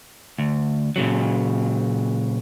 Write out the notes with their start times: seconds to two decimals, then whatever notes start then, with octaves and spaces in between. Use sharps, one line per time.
0.38 D2
0.96 A#2 C#3 F#3